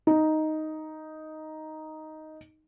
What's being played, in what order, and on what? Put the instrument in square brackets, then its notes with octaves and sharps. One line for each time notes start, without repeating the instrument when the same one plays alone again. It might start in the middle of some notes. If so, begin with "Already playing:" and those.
[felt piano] D#4